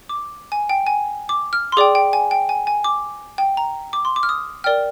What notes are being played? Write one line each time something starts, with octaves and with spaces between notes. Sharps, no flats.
D6
G#5
G5
G#5
D6
F6
C6
G#4 D5 G5 D6
G5
G#5
G5
G#5
G#5
D6
G5
A#5
D6
C6
D6
F6
D#6
A#4 D5 G5 F6